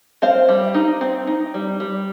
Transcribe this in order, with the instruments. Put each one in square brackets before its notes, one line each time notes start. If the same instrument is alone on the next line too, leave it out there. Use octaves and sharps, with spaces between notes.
[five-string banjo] C4 C5 F5
G3
D#4
C4
D#4
G3
G3